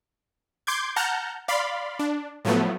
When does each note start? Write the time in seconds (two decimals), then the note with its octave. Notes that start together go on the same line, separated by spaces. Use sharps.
0.67 C6 D6 G6 G#6
0.96 F#5 A5 A#5 F6 G6
1.48 D5 F5 B5 C6
1.99 D4
2.45 A2 F3 F#3 A3 B3